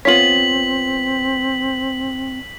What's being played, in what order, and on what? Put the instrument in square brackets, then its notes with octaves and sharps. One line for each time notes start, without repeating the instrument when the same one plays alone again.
[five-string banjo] B3 F4 C#5 [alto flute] C4 [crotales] B6 F#7